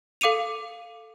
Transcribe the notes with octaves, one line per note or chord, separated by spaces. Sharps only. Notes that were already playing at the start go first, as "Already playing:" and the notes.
A4 F5 D6 C#7 D#7 F7